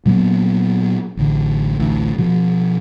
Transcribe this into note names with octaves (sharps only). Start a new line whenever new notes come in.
A#2 F#3 A#3 B3
A1 D3
A1 D2
B2 F3